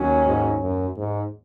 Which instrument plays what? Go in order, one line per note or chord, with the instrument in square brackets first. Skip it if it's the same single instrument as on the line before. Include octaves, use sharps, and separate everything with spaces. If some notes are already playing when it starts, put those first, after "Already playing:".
Already playing: [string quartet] D#2 D#3 F#3 C#4
[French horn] G#2
F#2
G#2